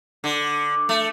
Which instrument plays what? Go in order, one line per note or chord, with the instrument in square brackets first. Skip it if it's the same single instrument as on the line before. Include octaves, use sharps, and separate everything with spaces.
[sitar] D3
A3